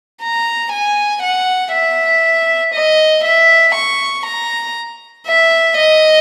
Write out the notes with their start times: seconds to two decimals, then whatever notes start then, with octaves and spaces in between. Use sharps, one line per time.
0.22 A#5
0.72 G#5
1.23 F#5
1.73 E5
2.74 D#5
3.24 E5
3.75 C#6
4.26 A#5
5.27 E5
5.78 D#5